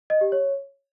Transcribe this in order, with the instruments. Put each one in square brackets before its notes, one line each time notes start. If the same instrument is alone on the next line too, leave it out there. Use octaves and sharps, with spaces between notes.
[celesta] D#5
G4
C#5